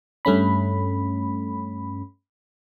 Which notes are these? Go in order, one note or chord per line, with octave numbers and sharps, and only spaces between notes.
G2 A3 C#4 B5